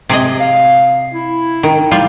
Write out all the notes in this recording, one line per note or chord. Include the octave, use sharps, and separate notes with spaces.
C3 G#4 D#5
F5
E4
D#3
G3 F4